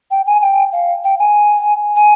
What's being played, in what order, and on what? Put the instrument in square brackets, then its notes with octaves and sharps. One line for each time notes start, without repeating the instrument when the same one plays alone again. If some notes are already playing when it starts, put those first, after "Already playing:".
[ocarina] G5
G#5
G5
F5
G5
G#5
G#5